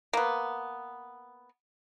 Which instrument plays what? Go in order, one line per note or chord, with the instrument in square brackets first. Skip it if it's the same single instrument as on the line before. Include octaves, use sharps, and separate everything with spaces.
[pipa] A#3 B3